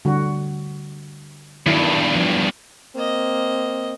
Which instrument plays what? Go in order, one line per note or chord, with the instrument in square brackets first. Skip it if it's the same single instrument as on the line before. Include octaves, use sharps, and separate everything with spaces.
[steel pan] D3 G3 F#4
[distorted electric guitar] E2 G2 [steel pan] D#3 F#3 E4
[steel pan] F3
[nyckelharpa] A#3 D#5 [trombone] C4